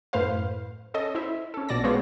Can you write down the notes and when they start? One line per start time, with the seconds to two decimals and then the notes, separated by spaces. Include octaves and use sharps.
0.13 F#2 A2 B4 C5 F5
0.94 C#4 A4 D#5
1.15 E4 C5 E5
1.54 C#4 A4
1.69 A#1 B2 D5 A5 A#6
1.84 G#3 B3 C4 F4 C#5 D5